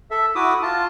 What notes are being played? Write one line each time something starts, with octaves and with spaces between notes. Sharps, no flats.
A4 E5
E4 F#4 D6 D#6
F4 A5